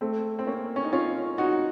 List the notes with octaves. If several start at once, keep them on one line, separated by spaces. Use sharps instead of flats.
A3 C4
C4
A#3 C#4
C#4
D#4
C#4 F4
D#4 F#4